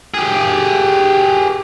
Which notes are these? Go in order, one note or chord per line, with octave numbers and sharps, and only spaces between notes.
G4 G#4